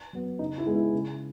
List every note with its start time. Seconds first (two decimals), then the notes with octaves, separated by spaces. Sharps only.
0.13 F#3 B3
0.39 C#3 D#4
0.58 E4
0.66 G#3 B3
0.76 E4
0.93 C#3